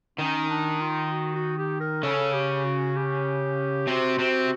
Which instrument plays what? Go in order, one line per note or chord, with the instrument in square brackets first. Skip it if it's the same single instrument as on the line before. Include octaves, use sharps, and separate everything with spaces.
[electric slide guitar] D#3 D#4 [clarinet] C#4
[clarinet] D4
F4
F4
F#4
F#4
G4
A#4
[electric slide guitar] C#3 C#4 [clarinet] A4
[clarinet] G4
F#4
G4
[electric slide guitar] C3 C4 [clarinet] F#4
[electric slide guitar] C3 C4